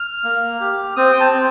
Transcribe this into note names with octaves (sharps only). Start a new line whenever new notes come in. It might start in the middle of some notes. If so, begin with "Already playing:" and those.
Already playing: F6
A#3
G4
C4 D#6
G5
A5
C4